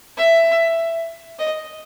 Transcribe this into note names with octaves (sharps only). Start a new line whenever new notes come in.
E5
D#5